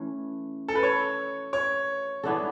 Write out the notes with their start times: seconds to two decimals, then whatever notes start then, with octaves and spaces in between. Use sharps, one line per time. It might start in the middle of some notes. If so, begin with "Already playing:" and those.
Already playing: E3 A3 C#4
0.68 A4
0.75 B4
0.83 C#5
1.53 C#5
2.23 E3 B3 D4 A4